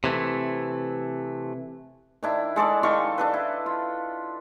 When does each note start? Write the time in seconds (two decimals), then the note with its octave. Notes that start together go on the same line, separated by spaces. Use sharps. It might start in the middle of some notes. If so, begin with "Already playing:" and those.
0.04 C3 E3 A3
2.23 D#3 D4 E4
2.56 G#3 A4 D5 D6
2.83 D#3 A4 F5 C#6
3.18 D4 A4 B4
3.34 E4
3.66 F4